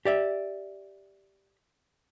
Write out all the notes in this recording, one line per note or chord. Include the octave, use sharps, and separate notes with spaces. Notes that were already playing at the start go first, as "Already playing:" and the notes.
G4 D5 E5